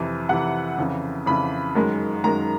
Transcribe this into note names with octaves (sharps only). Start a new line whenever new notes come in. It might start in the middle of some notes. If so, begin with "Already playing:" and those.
Already playing: F2 C3 E3
F2 C3 E3 F#5
F2 C#3 E3
F2 C#3 E3 B5
F#2 D#3 G#3
F#2 D#3 G#3 A#5